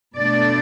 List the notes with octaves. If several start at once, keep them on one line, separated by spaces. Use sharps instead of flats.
B2 A3 D4 D5